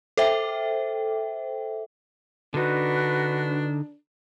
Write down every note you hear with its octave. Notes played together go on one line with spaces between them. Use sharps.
A4 C5 E5 G5
D3 D4 D#4 F#4 B4